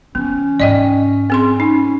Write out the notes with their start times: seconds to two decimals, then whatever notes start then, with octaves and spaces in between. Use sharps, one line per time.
0.15 E3 B3 C#4
0.60 G#2 D#4 D5 D#5 G5
1.30 C4 G#4 C6
1.60 C#4 D#4